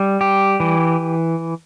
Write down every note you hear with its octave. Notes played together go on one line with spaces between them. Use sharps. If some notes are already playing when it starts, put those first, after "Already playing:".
Already playing: G3
G4
E3